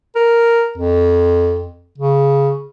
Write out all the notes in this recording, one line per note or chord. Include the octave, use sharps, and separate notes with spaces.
A#4
F2
C#3